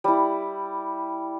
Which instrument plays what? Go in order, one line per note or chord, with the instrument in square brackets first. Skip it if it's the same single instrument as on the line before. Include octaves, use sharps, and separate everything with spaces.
[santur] G3 E4